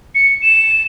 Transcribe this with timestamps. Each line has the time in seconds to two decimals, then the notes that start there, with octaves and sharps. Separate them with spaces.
0.15 C#7
0.42 E7